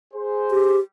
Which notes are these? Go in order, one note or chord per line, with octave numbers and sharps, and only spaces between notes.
G#4 C5
G4